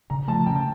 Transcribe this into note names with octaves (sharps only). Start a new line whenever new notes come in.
C#3 A#5
F3 A3 A5
C#3 G5
A5